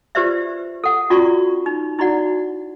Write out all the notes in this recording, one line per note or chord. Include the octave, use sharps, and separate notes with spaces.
F4 G4 B4 C5 D5 E5
A4 F#5
C#4 F4 F#4 D5 A#5 C#6
D#4
D#4 E4 F#4 D5 F#5